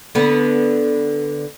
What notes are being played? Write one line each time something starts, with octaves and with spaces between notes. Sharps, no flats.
D3 B3